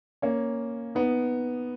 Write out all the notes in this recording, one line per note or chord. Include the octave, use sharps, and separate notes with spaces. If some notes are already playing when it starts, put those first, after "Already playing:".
A#3 C#4
B3 D#4